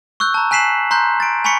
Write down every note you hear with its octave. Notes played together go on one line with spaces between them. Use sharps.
C#6 E6 F#6 G6
A5 A#5
G#5 F#6 B6 C7 E7 F#7
A#5 C6 F#6 G6
A6 D7
G#5 B5 C#6 B6 C#7